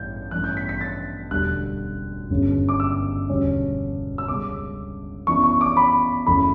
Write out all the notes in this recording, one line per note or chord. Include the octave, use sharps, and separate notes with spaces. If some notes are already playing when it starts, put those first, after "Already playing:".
Already playing: A1 G2 E3 G3 D4 G6
A1 G2 E3 A3 D4 F#6
G6
B6
B6
A6
E1 D2 D3 G3 F#6
G1 F#2 C#3
D6
E6
E1 D2 C#3 G3 C#4
E6
C#2 C#3 G3 D6
F#2 E3 B3 D4 C#6
C#6
D6
B5
F#1 F#2 E3 A3 B5